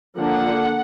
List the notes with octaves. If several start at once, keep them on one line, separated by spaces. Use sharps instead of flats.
D3 F3 A#3 D4 F#5